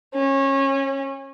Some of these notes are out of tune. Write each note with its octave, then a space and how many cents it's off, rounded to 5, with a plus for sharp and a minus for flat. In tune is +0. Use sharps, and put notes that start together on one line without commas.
C#4 -25